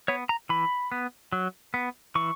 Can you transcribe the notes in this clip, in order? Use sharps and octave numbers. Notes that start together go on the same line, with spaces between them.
B3 C#5
A#5
E3 B5
B3
F#3
B3
E3 C#6